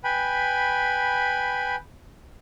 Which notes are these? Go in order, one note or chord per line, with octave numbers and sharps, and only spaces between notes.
B4 G5 G#5 B5